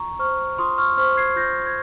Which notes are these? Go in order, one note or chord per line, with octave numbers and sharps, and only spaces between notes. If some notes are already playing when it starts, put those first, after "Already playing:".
Already playing: F4 A#5 C#6
C5 C#6 F6
F4 C6 D#6
C#6 F6
C5 C#6 F6
G#6 C7
F4 G6 A#6
G#6